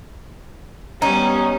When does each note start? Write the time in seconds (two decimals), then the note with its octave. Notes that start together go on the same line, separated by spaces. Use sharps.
1.02 G3 B3 C#4 D#4